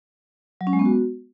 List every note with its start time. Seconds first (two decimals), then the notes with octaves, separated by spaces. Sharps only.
0.61 F#3
0.67 C#4
0.73 G#3
0.79 B3
0.85 F#4